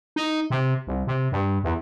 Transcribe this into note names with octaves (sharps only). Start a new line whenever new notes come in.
D#4
C3
C2
C3
G2
E2